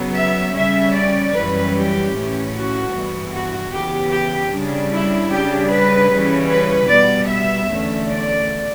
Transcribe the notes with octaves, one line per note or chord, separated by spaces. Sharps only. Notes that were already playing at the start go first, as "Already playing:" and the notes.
Already playing: C#3 F#3 B3
E5
C#3 G3 C#4 E5
D5
F#2 E3 G3 C#4 B4
G4
A2 E3 A3 C#4
F#4
G2 E3 B3
F#4
C#3 E3 B3 G4
G4
C#3 G3 D4
E4
C#3 G3 D4 G4
B4
C#3 E3 G3 C#4
B4
B2 G3 B3 D5
E5
E2 D3 A3 C#4
D5